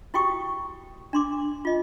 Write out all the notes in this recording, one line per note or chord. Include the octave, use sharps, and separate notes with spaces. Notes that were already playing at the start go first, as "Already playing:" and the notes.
E4 F#4 G4 G5 C#6 D#6
D4 C6 D6
F4 D#5